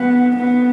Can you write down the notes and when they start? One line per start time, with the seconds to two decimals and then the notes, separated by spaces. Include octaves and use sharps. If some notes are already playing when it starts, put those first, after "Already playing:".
Already playing: B3
0.37 B3